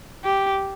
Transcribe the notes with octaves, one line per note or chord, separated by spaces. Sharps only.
G4